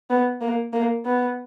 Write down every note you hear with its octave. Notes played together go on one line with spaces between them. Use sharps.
B3
A#3
A#3
B3